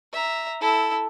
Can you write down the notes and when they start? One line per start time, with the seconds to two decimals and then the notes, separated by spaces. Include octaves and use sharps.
0.13 E5 A#5
0.61 E4 A4